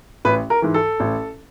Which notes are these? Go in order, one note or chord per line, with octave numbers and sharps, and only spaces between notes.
A1 B4
A#4
G#2 E3
A4
A1